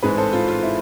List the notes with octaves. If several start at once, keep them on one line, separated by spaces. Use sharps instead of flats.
A1 G#2 G#3 C4 G#4 B4
A4 C5
F4
F4
E4